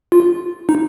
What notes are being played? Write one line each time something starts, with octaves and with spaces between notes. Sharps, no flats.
F4
D#4